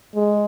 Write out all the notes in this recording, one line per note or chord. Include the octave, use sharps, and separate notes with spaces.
G#3